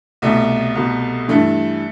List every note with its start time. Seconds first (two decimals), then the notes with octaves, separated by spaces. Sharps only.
0.22 C2 B2 A3
0.75 C2 B2
1.28 G2 E3 A3